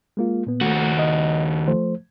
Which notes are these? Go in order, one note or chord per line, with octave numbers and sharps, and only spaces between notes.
G#3 A#3 F4
A#2 B3
D#2 A3 F#4
D#5
F3 A3 C5